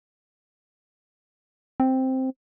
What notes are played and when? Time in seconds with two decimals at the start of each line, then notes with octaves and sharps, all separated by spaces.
1.80 C4